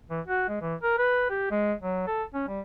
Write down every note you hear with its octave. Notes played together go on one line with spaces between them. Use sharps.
E3
F#4
G#3
E3
A#4
B4
G4
G#3
F#3
A4
C#4
G3